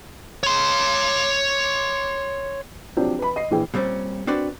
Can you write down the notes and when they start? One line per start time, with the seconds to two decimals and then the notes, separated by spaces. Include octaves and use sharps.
0.43 C#5 C6
2.97 F3 F#3 C4 D4 G4
3.19 B4 B5
3.36 D#5 C7
3.51 A#1 E3 G#4 G5
3.74 A#2 G3 C4 C#4
4.27 C4 D4 F#4 B4 D5